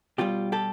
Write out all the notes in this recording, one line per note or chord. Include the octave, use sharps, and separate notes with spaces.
B2 G3 F4 G4
G4 A4